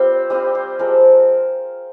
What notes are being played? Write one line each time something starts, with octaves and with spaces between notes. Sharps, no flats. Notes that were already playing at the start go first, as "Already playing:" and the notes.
Already playing: G3 C4 F4 C5
G3 C4 F4 D#5
C5
F3 G#3 C4 A#4